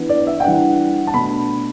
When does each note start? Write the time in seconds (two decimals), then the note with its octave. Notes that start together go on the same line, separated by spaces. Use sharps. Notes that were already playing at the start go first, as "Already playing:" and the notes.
Already playing: E3 B3 D4
0.09 D5
0.27 E5
0.40 G5
0.44 E3 G3 D4 F#5
1.07 A5
1.14 B2 A3 D4 B5